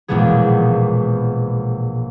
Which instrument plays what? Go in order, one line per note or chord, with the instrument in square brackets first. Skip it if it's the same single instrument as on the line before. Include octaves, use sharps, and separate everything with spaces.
[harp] A#1 E2 B2 G#3 B3 G#4